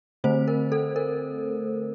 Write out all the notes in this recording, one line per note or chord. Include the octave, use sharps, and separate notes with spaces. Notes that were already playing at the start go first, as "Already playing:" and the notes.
D3 A3 C4 C5
A#4
A4
A#4